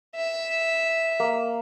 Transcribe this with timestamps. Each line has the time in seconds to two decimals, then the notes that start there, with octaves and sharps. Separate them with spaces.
0.16 E5
1.20 A#3